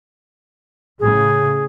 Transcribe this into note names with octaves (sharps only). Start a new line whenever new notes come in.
A2 C#3 G#4